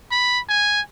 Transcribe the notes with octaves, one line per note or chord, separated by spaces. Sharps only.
B5
G#5